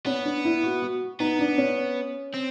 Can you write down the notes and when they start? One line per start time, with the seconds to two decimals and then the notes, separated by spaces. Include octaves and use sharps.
0.06 B3 C#4
0.25 D4
0.45 E4
0.63 F#4
0.82 F#4
1.20 B3 D#4
1.39 D4
1.58 C#4
2.34 C4